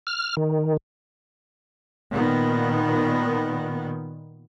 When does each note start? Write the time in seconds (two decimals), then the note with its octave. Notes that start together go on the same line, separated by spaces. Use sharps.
0.07 F6
0.37 D#3
2.13 A#2 D#3 B3